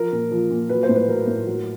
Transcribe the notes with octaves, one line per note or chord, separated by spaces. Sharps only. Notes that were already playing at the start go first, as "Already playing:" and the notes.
Already playing: F3 A#4
A#2
F3
A#2
F#3 B4
C5
A2
B4
F#3 A#4
A2
F#3